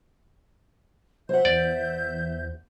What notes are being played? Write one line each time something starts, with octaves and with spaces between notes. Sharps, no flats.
F#3 C5 E5 F#5 G6
E2 D5